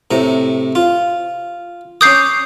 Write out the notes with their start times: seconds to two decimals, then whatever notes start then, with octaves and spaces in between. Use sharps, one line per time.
0.11 A2 C3 A#5
0.75 F4
2.01 C#4 D6 D#6 G6 C7